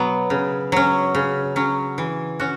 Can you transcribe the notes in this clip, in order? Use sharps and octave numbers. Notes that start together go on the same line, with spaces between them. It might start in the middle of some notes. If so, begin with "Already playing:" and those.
Already playing: B2 F#3 B3
C#3
F#3 C#4
C#3
F#3 C#4
E3
C#4 F#4